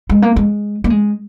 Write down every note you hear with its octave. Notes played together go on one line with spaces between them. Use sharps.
G#3
A#3
G#3
A#3
G#3